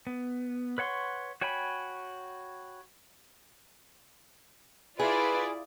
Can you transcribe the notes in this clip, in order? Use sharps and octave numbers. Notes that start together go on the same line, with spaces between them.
B3
B4 C#5 F#5 C6 C#6
F#4 C#5 G5 G#5 B5
E4 F4 G#4 B4 D5